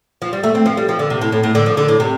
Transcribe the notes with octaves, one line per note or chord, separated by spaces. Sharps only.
F3
G3
A3
C4
F3
G3
F3
D3
C3
A2
A2
A2
D3
F3
D3
A2
C3